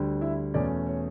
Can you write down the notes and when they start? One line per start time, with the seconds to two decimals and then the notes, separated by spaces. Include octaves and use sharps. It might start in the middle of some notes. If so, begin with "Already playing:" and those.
Already playing: D2 D3 G3
0.21 E4 E5
0.54 E2 B2 A3 C#4 D5
0.86 C#5